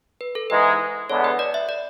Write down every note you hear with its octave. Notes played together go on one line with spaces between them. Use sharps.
B4
A4
G#2 E3 G#3 B4
E2 D3 G#3 B3 C#5
B4
D5
E5
D5